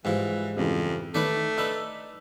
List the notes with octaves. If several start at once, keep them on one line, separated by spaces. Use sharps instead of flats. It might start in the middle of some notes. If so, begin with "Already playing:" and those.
G#2 E3 F3 G3
F2 C#3 E3 G3
D#3 A3 B4 C#5 D5
D4 D#4 B4 E6